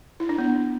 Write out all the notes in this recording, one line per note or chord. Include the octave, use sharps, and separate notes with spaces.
E4
D4
B3